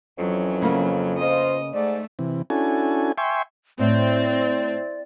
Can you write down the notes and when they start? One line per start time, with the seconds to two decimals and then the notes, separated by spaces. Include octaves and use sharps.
0.18 F2 E3 F#3 C#4
0.62 C#3 A#3 B3
1.18 F4 C5 D#5
1.73 G#2 A3 D5
2.19 C3 E3
2.50 C#4 D4 E4 F#4 A4 G#5
3.18 E5 G5 G#5 C6 C#6
3.79 A2 C4 D5